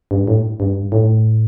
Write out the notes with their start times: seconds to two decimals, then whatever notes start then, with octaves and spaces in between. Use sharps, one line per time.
0.11 G2
0.28 A2
0.60 G2
0.92 A2